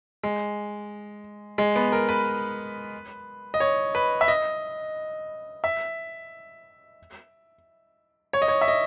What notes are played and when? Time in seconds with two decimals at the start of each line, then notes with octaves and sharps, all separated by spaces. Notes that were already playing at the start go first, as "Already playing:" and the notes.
0.23 G#3
1.58 G#3
1.76 B3
1.92 A#4
2.09 B4
3.54 D#5
3.60 C#5
3.95 B4
4.21 E5
4.28 D#5
5.64 E5
8.33 C#5
8.42 D#5
8.48 C#5
8.61 E5
8.68 D#5